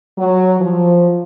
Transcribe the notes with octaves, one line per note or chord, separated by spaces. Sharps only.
F#3
F3